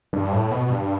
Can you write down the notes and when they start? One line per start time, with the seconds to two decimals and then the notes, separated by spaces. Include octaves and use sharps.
0.13 G2
0.32 A2
0.51 B2
0.70 G2